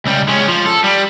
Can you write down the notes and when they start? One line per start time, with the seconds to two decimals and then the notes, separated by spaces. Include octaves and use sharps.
0.05 C#2 G3
0.29 G#3 C#4
0.49 F3
0.66 A4
0.84 G3